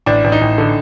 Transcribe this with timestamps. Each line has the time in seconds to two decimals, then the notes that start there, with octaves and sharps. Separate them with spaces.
0.06 A1 D4
0.24 A1
0.32 D#4
0.41 A1
0.58 D3